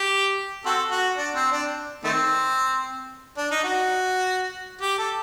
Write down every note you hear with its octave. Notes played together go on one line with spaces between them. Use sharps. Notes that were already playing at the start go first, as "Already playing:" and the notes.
Already playing: G4
C4 F#4 A4
F#4
D4
C4
D4
D#3 A3 C4
D4
D#4
F#4
G4
A4